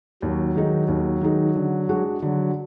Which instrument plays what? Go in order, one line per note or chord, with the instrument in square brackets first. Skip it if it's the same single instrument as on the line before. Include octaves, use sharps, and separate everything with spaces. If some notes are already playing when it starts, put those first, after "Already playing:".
[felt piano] D#2 [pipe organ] F#3
[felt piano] D#3 G#3 D#4
D#2
D#3 G#3 D#4
D3
G#3 D4 F#4
[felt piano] D3 [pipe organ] F#3